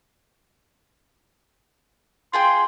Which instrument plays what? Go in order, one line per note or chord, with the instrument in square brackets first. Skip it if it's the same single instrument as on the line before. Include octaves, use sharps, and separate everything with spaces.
[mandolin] F4 G#4 G5 [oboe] C6